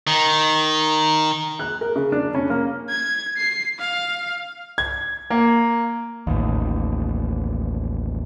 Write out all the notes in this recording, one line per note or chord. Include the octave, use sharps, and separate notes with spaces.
D#3
F#6
A#4
C#3
D4
C#4
A#3
G#6
C7
F5
G#6
A#3
A1 D#2